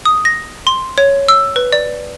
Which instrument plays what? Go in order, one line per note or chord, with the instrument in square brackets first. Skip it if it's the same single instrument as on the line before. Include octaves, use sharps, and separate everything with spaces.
[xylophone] D#6
A#6
C6
C#5
E6
B4
D5